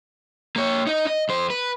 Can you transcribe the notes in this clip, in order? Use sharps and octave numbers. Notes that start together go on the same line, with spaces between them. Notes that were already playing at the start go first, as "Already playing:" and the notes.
A#3 C#5
D#4 D#5
D#5
F2 C5
B4